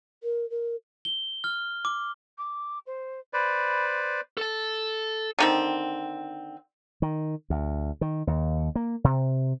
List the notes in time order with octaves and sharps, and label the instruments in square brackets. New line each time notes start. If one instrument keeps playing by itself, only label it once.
[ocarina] A#4
A#4
[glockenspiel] G7
F6
D6
[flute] D6
C5
[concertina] B4 C5 D5 [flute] B5
[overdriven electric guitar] A4 A5
[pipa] D3 D#3 C4
[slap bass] D#3
D2
D#3
D#2
A#3
C3